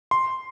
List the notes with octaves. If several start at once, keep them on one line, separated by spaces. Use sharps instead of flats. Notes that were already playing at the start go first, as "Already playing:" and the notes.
C6